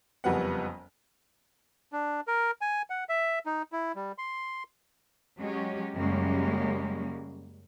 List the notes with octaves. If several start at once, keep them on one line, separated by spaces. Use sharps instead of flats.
F#1 F2 G3 B3 F#5
D4
A#4
G#5
F#5
E5
D#4
E4
G3
C6
F#3 G#3 C#4 G4
F#2 C#3 G3 G#3 A#3 C#4